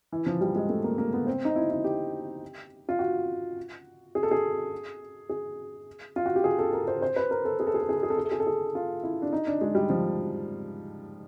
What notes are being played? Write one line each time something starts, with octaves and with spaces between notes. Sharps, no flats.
E3
F3
G3
G#3
A3
A#3
A#3
B3
C4
D#4
E4
E4
G4
F4
F#4
G#4
A4
G#4
G#4
F4
F#4
G4
G#4
A4
A#4
C5
C5
B4
A#4
A4
G#4
A4
G#4
A4
G#4
A4
G#4
A4
G#4
A4
G#4
A4
G#4
F4
E4
D4
D#4
D4
G#3
G3
F3